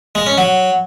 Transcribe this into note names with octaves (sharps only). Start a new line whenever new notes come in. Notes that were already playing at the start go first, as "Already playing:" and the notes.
G#3
C#4
F#3